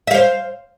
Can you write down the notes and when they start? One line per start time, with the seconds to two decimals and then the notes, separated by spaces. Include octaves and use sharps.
0.07 E5
0.11 F5
0.14 C5